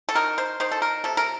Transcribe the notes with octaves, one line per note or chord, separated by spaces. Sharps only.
A4
D#3 A#4
C5
D#3 C5
A4
A#4
C3 A4
A#4